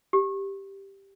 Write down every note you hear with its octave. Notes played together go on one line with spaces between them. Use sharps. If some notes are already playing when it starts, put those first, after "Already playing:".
G4